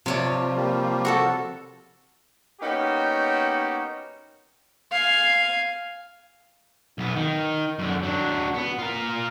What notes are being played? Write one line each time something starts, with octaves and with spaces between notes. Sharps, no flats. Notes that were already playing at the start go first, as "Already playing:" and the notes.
C3 F3 C#5 D5
G3 A#3
F#4 A4 A5
A#3 B3 C#4 D#4 F#4 G4
F5 G#5
B1 B3
D#3
F#2 D3
F#3 D4
B3
F4 A#4